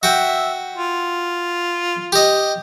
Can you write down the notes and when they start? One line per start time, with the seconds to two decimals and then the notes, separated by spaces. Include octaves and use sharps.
0.03 F#4 E5 G5
0.76 F4
2.12 G4 D#5